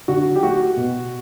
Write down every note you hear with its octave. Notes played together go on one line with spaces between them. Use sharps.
D3 F#4
G4
A3 F#4
B2